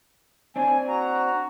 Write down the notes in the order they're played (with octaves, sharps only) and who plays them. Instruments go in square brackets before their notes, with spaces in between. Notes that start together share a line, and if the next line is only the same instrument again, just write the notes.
[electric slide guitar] C4 D4 [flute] G#5
[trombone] F#4 [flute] A#5